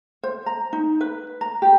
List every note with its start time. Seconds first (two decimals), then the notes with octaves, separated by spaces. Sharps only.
0.23 C5
0.46 A#5
0.73 D#4
1.01 B4
1.41 A#5
1.62 G4